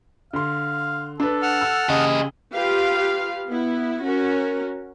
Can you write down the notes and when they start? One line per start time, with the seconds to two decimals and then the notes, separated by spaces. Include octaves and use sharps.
0.33 D3 F5 C6
1.20 D4 A4 B4
1.42 F#5 A5 F6
1.61 E6
1.89 C#3 G4 G#4 D#5
2.54 F4 G4 B4 F5
3.48 B3 E4
4.04 C#4 F#4 A#4